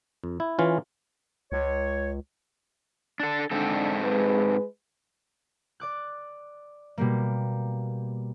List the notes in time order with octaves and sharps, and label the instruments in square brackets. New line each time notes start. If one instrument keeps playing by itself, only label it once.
[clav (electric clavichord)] F2
E4
E3 C#4 F4
[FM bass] C#2 [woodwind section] C#5
[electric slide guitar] D4 A4
[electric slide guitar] G#2 C4 A4 [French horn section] D3 D4
[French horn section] G#3 B4
[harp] D5 D6 F#6
B2 G3 A#3